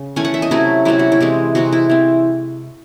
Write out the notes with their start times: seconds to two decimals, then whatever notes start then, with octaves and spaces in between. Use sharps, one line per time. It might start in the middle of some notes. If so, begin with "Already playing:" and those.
Already playing: C#3
0.16 E3 A3 C#4 G#5
0.25 F#5
0.34 E5
0.42 D#5
0.51 C3 F#3 A3 C#4 E4
0.85 C3 F#3 A3 C#4 E4
0.99 F#4
1.12 E4
1.21 C3 E3 G#3 C4
1.55 C3 E3 G#3 C4 F#4
1.73 E4
1.90 E3 C4